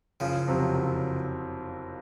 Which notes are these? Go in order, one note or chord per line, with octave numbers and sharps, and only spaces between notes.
F#1 C#3 F3
F2 C3 F#3 C4
F#1